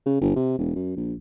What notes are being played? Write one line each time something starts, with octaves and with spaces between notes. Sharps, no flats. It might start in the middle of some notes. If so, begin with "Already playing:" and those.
C#3
G1
C3
E1
F#2
A#1